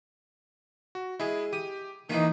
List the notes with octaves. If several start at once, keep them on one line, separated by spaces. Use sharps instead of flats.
F#4
G#3 E4 G#4
G4 D#6
D#3 E3 A#3 D#4 C5